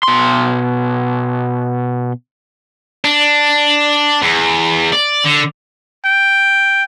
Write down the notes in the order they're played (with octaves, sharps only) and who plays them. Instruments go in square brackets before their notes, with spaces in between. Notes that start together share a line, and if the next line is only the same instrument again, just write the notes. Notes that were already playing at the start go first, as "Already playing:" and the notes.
[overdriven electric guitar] B2 C6
[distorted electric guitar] D4
E2
D5
D3
[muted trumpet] G5